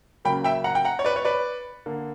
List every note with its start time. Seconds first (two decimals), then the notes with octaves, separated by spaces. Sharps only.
0.25 C#3 F#3 A#3 G5 B5
0.44 E5 G5
0.64 F#5 A#5
0.75 G5
0.85 F#5 A#5
0.99 C#5
1.04 B4 D5
1.16 C#5
1.25 B4 D5
1.86 D3 A#3